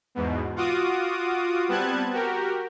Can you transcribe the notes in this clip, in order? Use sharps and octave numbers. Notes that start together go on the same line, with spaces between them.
E2 G#2 B2
F4 F#4 D6 D#6
G3 B3 C4 A5 F#6 G#6
F#4 G4 A#4